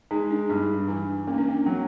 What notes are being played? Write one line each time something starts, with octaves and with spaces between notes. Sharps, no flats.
G#3 D#4
D4
G2 D#4
E3 D4
A#3 C#4
D4
C#4
F#3 C4